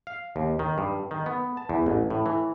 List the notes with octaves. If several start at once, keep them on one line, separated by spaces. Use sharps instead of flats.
F5
D#2
D#3
G2
D#3
B3
A5
E2
A1
A2
E3